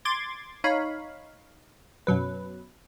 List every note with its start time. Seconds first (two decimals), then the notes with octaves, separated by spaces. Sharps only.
0.05 C6 D6 G#6 A6
0.64 D#4 C#5 F5 B5
2.07 F#2 B2 F#3 B4